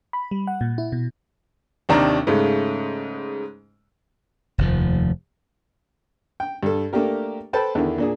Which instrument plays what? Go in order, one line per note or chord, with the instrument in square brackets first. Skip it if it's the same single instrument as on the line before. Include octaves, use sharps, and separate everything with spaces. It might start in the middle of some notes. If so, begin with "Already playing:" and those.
[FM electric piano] B5
G3
F#5
A#2
E4
B2
[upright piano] D#2 C3 D#3 D4 A#5
G#2 C#3 G#3 A3
[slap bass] F1 D#2 F3
[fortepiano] G5
G2 A4
A3 A#3 D4 G4 A#4
A4 B4 C5 G5 A5 B5
E2 D3 D#3 E4
A#2 D4 G#4